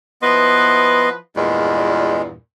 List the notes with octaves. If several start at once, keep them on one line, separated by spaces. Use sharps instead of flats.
F3 B3 E4 B4 D#5 C6
E2 G2 A#2 G#3